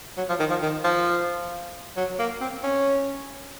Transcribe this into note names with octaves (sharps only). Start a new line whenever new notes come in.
F#3
F3
D#3
F3
D#3
F3
F#3
A#3
C4
C#4